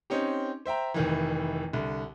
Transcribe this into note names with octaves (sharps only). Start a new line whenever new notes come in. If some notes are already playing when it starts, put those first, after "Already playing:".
C4 C#4 D#4 G4
C5 E5 G5 A#5
F1 D#3 E3
C2 D3